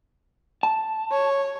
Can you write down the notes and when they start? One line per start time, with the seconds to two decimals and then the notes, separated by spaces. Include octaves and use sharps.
0.63 A5
1.11 C#5